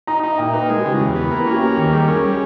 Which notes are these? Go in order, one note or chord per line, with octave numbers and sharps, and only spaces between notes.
D#4 A#5
D#4 A#5
E5
A#2 G5
D#4 B4
G#3 A#4
G4
C#3
E4
E2 G4
B3
A#3 B4
E4
C#4
G4
A#3
D#2
G3 G#4
C#4 A#4
G3 G#4